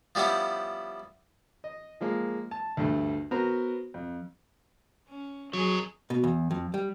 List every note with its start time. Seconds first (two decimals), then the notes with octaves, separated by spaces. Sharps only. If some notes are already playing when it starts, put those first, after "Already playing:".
0.15 F3 G3 B3 C#4 E4
1.64 D#5
2.01 F3 G#3 A#3
2.51 A5
2.77 D2 G2 A3
3.31 B3 F#4 A#4 C5 A#5
3.94 F2
5.08 C#4
5.53 F2 F#3 G#4 A#4 C#5
6.10 B2
6.24 E2
6.51 F2
6.74 G3